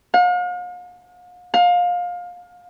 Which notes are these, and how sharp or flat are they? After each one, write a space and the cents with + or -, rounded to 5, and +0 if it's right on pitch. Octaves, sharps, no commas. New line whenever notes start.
F5 +45
F5 +25